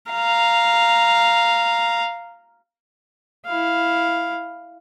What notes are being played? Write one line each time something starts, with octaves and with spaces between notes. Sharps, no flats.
F5 A#5
E4 F5